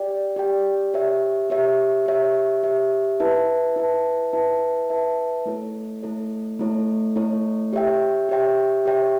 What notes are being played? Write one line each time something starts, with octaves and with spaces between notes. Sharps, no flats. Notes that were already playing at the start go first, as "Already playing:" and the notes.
Already playing: G4 D5 G5
G4 D5 G5
G4 C#5 E5
G4 C#5 E5
G4 C#5 E5
G4 C#5 E5
E4 B4 E5 A5
E4 B4 E5 A5
E4 B4 E5 A5
E4 B4 E5 A5
A3 E4 A4 C#5
A3 E4 A4 C#5
A3 E4 A4 C#5
A3 E4 A4 C#5
G4 C#5 E5 G5
G4 C#5 E5 G5
G4 C#5 E5 G5